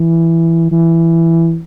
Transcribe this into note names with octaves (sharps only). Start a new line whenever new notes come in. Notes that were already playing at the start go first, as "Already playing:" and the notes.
Already playing: E3
E3